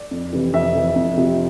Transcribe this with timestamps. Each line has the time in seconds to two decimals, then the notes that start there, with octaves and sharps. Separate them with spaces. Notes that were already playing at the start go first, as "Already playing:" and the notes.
Already playing: D5
0.11 F2
0.33 C3 E3
0.54 F2 E5
0.75 C3 E3
0.96 F2
1.17 C3 F3